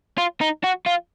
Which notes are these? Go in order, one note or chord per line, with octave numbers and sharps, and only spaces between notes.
F4
D#4
F#4
F4